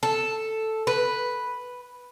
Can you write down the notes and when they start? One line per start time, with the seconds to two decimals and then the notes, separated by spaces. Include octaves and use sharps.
0.03 A4
0.87 B4